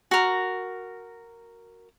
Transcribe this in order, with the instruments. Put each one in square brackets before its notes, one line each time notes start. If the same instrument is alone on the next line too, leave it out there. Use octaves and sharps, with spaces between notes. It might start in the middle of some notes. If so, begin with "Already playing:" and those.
[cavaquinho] F#4 A#4